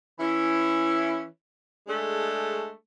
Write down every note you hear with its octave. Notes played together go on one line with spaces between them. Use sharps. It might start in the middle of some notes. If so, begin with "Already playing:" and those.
E3 C#4 E4
G#3 A3 D4 G#4